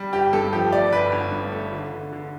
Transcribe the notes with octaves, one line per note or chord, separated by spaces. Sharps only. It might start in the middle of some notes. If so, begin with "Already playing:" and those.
Already playing: G3
G1 G4
G2 A4
F3 G4
A3 D5
G1 B4
G1
G2
A3
D3
D3
D3